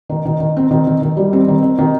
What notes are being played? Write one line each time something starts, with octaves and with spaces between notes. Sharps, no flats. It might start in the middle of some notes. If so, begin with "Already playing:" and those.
D#3
D#3
D#3
C4
D#3
D#3
D#3
G3
C4
D#3
C4
D#3